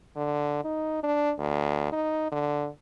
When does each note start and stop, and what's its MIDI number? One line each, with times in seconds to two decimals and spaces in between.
0.16 0.62 50
0.64 1.01 63
1.03 1.32 62
1.39 1.89 38
1.92 2.31 63
2.32 2.68 50